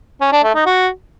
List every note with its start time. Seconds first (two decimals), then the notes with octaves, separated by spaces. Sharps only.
0.21 C#4
0.32 D4
0.43 A3
0.55 D#4
0.66 F#4